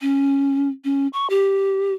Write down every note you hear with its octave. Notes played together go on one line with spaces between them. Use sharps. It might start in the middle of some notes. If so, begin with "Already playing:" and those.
C#4
C#4
C#6
G4